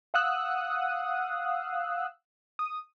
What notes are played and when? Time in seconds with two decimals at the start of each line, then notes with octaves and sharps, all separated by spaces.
0.14 F5 F#5 D#6 E6 F#6
2.59 D#6